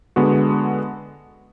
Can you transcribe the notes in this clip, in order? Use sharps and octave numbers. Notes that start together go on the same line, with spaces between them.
D3 G#3 B3 F#4